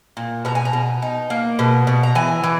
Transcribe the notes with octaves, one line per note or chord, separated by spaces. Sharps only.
A#2
B2 A#5
G#5
A#5
B2
D#4
A#3
B2
B2
A#5
E3 G#5
E3